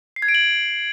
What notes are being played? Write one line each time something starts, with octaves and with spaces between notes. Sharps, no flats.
C7
G#6
D7
F#7